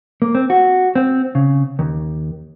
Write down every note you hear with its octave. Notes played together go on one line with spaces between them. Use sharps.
A#3
C4
F#4
C4
C#3
D#2